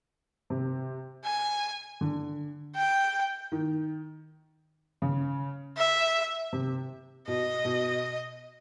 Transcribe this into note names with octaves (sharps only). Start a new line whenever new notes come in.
C3
G#5
D3
G5
D#3
C#3
E5
C3
B2 D#5
B2